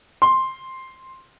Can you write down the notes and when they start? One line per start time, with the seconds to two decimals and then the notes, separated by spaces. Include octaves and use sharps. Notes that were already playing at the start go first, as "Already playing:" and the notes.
0.22 C6